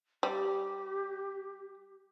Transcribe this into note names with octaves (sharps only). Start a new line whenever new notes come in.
G3 G4